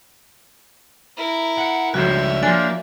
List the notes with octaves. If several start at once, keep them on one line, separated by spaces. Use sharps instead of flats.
E4 A#4
F#5
C#2 G2 F3 A3 F#4 C#5 E5
F3 A#3 D4 G#5 F#6